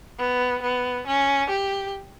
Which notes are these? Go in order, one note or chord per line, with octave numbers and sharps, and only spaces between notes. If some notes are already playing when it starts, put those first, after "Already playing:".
B3
B3
C#4
G4